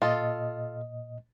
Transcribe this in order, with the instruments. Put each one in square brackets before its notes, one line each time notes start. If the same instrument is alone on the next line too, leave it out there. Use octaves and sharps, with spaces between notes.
[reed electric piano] A#2 D#5 [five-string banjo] F4 A4